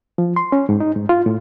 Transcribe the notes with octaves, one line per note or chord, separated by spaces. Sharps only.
F3
C6
C#4
G#2
D#4
G#2
F4
A2